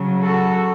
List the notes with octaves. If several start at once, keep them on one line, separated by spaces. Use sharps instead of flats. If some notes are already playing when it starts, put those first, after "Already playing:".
Already playing: C#3 F#3
F#4 A4